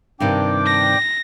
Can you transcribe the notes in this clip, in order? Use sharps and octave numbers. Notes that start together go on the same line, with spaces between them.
G2 C3 D#3 D4 G5 D6
A#6